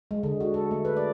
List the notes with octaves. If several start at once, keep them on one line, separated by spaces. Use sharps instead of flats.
G#3
D3
F#4
A4
A3
B4
D5